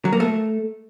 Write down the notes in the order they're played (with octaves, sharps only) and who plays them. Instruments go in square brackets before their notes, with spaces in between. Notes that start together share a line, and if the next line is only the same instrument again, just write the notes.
[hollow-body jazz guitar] F#3
A#3
A3